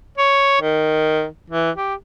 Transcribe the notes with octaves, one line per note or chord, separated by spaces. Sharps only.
C#5
D#3
E3
G4